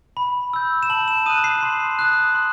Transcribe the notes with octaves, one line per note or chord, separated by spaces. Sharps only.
B5
E6 G6
E7
A5 F#7
E7
D#6 F#6 D#7
C7
C6
D#6 F#6
C6